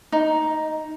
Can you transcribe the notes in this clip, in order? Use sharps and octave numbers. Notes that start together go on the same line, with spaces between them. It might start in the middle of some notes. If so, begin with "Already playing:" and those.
D#4